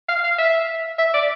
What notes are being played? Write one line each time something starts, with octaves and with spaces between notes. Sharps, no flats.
F5
F5
E5
E5
D5